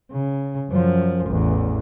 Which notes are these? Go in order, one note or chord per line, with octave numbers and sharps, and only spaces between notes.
C#3
F#2 F3
A1 E2